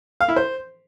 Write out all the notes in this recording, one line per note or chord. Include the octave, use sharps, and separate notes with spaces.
F5
E4
C5